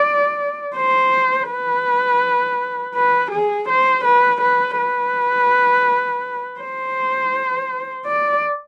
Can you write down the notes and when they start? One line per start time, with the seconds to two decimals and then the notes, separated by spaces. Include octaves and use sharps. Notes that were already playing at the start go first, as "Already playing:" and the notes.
Already playing: D5
0.76 C5
1.50 B4
2.95 B4
3.31 G#4
3.69 C5
4.04 B4
4.41 B4
4.78 B4
6.60 C5
8.06 D5